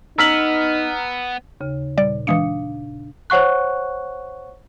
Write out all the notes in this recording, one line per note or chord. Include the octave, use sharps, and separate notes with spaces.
B3 D#4 A#5 E6 F6 B6 F#7
D#2 C#3
A#2 G3 D5
E3 G#3 D4 F5 D#6 C#7
C5 C#5 F#5 C#6 F#6